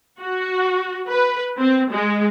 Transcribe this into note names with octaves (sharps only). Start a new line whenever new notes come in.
F#4
B4
C4
G#3